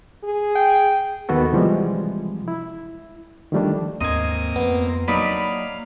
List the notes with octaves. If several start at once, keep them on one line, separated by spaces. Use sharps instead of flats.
G#4
G5
D#2 D#3 B3 F#4 A4
C3 E3 F3 G3 G#3
E4
D#3 F3 G3 A3 D4
D#2 G#2 A#3 C4 D#5 G#5
F2 B3
F#3 A#3 D4 D#4 F5 B5